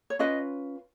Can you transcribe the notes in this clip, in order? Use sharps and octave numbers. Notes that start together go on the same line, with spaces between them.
C#5
C#4 F4 B4 D#5